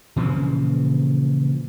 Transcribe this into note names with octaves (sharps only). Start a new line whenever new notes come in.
A#2 C#3 E3 F3